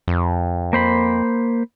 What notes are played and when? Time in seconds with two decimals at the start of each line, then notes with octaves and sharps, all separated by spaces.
0.08 F2
0.73 A#3 C5 B5